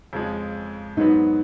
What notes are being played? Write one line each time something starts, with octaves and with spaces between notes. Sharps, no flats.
F2 C#3 F3 G#3
G#2 F#3 B3 D#4